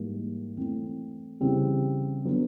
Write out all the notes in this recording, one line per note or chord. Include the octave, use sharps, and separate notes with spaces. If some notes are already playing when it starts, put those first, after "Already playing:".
Already playing: G#2 E3 G3 A#3
E3 A3 C4
C#3 E3 G3 C4
D3 F#3 B3